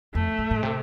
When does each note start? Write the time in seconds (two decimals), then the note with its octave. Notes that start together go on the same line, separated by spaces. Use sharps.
0.15 F2 A3
0.39 A2
0.51 A2
0.63 C3